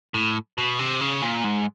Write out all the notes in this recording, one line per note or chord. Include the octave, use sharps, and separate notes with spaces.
A2
B2
C3
C#3
A#2
G#2